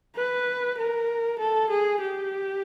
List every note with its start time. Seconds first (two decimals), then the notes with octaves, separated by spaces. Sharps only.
0.16 B4
0.78 A#4
1.39 A4
1.70 G#4
2.01 G4